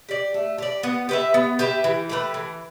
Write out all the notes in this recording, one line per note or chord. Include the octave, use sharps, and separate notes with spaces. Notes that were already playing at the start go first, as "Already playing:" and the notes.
G4 D5
A3
G4 D5
B3
G4 B4 E5
B3
G4 B4 E5
E3
A3 G4 B4
E3